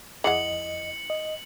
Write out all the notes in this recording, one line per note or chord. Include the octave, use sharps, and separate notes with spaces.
F2 E3 G#4 D#5 F#5 C#7 F#7
D#5